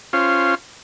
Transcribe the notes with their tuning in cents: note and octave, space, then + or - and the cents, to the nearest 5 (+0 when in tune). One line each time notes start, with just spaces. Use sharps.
C#4 -10 F4 -15 C5 +0